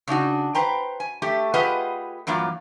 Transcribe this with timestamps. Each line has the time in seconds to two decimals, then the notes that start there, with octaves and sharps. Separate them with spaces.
0.08 C#3 D4 D#4 F#4
0.55 B4 C5 G5 A#5
1.00 G#5
1.22 A3 G4
1.54 F4 G4 G#4 B4 D#5 F#5
2.27 G2 E3 F#3 A#3 F4